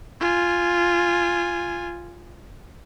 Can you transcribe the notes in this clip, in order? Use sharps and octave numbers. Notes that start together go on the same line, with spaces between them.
F4 G#5